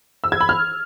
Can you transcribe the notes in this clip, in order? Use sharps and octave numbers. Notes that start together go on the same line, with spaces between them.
E6
G#6
B5
F6